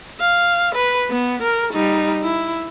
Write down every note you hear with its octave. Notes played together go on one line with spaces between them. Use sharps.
F5
B4
B3
A#4
G3 D#4
E4